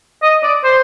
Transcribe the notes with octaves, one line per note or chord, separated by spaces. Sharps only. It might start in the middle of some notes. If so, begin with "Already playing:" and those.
D#5
D5
C5